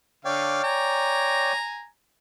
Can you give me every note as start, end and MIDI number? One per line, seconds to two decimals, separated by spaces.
0.25 0.61 50
0.25 1.52 73
0.25 1.52 74
0.25 0.61 77
0.25 1.52 79
0.64 1.87 80
0.64 1.87 82